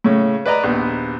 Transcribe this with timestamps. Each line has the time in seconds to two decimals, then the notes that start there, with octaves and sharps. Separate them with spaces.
0.04 A2 C#3 C#4
0.46 B4 D5 D#5 A#5
0.64 A#1 D#2 B3